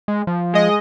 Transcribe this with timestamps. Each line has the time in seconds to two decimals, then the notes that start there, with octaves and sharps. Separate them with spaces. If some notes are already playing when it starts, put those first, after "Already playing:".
0.08 G#3
0.27 F3
0.54 G#3 D#5